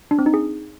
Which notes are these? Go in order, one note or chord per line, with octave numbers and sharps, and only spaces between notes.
D4
C4
D#4
G#4